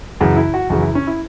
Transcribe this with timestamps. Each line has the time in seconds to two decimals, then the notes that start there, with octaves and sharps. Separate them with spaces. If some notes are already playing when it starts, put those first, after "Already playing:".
0.20 F#2 C#3 E3 F#4
0.36 E4
0.54 F#4
0.70 F#2 C#3 E3 F#4
0.82 E4
0.95 C#4
1.07 E4